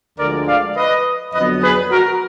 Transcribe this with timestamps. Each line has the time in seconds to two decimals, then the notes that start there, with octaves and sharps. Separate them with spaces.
0.18 D2 D3 F3 G#3 A#4 D5
0.48 D5 F5
0.77 B4 D#5
1.33 F2 D3 F#3 B3 B4 D#5
1.62 G#4 B4
1.91 F#4 A#4